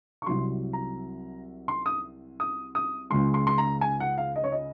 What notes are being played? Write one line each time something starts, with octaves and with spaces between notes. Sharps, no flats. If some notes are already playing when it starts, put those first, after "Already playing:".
C#6
C2 C3 F#3 C6
A#5
C6
D#6
D#6
D#6
C#2 C#3 G#3 C6
C6
C6
A#5
G#5
F#5
F5
D#5
C#5
D#5